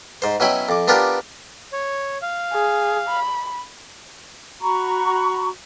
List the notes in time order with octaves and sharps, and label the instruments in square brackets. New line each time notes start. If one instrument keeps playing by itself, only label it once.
[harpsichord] G#2 C5
B2 F#3 C#4 E4 G5 B5
F2 D6
B3 D4 F4 G4 A#4
[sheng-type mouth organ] C#5
F5
[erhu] G#4
B5
[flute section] F#4 A#5 B5 C#6